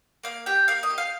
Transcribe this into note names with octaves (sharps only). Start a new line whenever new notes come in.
A#3 F5
G4 G5
A#3 F5
D#5
G4
F5